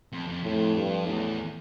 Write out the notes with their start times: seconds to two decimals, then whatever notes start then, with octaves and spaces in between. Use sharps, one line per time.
0.12 F2
0.28 F2
0.44 F2 A2
0.75 G2
1.06 E2 A2